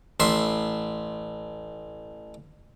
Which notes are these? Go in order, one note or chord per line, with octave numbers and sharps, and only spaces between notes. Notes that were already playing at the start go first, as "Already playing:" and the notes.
A1 E5 C6